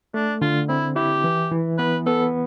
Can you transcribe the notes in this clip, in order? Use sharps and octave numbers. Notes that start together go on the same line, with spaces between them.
A3 D4
D3 F4
C4 E4
E4 G4
E3
E3
B3 B4
B3 A4